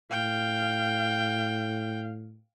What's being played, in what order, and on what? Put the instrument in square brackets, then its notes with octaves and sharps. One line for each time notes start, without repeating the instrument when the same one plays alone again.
[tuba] A2 [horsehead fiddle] F5 [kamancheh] G5